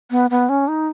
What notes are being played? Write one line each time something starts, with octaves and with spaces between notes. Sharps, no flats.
B3
B3
C#4
D#4